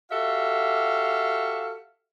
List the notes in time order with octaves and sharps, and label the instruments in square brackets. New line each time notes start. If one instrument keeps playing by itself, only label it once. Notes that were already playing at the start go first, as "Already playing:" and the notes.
[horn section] F#4 G4 A4 E5 F5